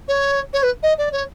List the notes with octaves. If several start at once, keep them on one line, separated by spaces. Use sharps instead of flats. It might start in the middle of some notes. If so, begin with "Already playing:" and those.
C#5
C#5
B4
D#5
D5
C#5